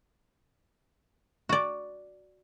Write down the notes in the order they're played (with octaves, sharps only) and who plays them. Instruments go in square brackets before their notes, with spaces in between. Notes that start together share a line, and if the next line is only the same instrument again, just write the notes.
[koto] F#4 D5